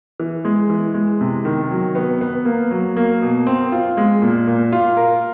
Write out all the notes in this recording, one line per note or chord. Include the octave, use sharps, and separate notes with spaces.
E3
G#3
E3
G#3
C3
D#3
F#3
B3
B3
A#3
F#3
A#3
B2
C4
F4
G#3
A#2
A#2
F4
A#4